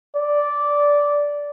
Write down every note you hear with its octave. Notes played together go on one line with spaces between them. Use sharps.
D5